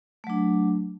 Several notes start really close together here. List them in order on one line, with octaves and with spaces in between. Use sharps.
A3 F#3 D4